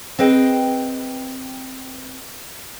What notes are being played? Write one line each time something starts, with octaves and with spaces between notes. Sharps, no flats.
C4 G#4 B4 D#5 G5